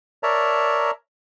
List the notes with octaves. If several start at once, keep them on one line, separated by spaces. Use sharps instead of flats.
A#4 C#5 D5 E5 A5 A#5